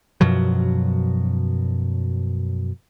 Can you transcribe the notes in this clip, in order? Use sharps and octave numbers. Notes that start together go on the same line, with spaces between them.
F#2 B2 F3 F#3